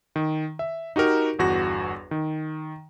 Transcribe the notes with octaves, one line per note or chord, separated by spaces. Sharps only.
D#3
E5
D#4 F#4 G4 A#4
G1 E2 F#4 A#6
D#3